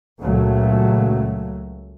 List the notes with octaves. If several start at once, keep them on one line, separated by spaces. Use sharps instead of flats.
C#2 A#2 F#3 A3